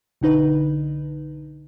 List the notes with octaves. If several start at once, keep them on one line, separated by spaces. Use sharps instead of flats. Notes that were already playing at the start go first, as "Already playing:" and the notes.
B1 D3 D#4 B4